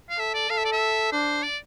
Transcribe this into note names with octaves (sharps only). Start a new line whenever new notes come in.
F5
A4 E5
D5
A4 F5
E5
D5
E5
D4 C5
D5